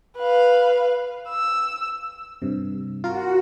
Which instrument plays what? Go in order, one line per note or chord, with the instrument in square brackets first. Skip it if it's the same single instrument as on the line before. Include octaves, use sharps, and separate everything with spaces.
[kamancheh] B4 F5
E6
[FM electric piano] G2 C3
[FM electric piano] F4 A#4 [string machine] F#4